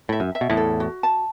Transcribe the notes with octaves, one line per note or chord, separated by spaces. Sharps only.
A2 E5
F#2
E5
B2
E2 A2
A4
F#4
A5